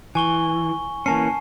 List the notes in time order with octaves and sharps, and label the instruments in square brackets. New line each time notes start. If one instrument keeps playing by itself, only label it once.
[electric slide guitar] E3 [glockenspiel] G#5 C#6 G7
[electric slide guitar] E3 A#3 C#4 [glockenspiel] G#5 A5 C7